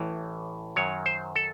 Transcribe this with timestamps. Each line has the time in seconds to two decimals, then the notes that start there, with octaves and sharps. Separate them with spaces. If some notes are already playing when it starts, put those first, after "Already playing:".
Already playing: A1 A2 E3
0.76 F#2 D#3 F#3 C#5
1.06 C5
1.36 A4